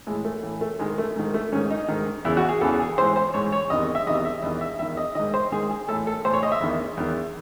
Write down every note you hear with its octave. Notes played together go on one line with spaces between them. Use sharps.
A2 E3 G#3
A3
A2 E3
A3
G#2 D#3 G#3
A3
G#2 D#3
A3
G#2 D#3 C#4
D#4
G#2 D#3
E2 C#3 E3 E4
F#4
G#4
E2 C#3 E3 A4
G#4
G#2 E3 C5
C5
G#2 E3 C#5
C#5
E2 C3 D#3 D#5
D#5
E5
E2 C3 D#3 D#5
E5
E2 D#3 D#5
E5
E2 D#3 E5
D#5
G#2 D#3 D#5
C5
G#2 D#3 G#4
G#4
A2 E3 A4
A4
A2 E3 C5
C#5
D#5
E5
E2 D#3
E2 D#3